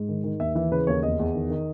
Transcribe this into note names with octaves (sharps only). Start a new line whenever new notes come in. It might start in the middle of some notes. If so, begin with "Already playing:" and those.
Already playing: G#2
D#3
D#3
D#2 E5
E3 E5
C#3 B4
D#2 C#5
E2 D#5
E2
D#3
D#3